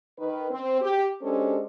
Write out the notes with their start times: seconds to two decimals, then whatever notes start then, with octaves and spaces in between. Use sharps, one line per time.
0.18 D#3 B4
0.50 C4
0.81 G4
1.21 G#3 C#4 D4 G4 A4 C5